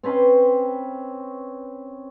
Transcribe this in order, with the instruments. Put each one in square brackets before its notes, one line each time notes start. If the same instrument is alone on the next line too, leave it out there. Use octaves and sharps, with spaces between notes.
[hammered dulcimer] C4 C#4 B4 C6